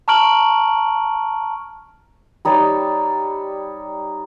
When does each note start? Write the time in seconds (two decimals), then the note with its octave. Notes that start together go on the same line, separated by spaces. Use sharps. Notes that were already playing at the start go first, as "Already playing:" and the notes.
0.08 A5 A#5 C#6 F6 D7 F#7
2.45 G3 D#4 C#5 D5